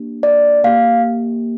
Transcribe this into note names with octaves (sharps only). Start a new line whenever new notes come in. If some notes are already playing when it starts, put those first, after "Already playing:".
Already playing: A#3 D4 G4
D5
A#3 G4 F5